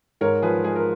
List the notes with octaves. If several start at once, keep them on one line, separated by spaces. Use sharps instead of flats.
G#2 A#4 C#5
F3 G#4 B4
G#3 G#4
A#4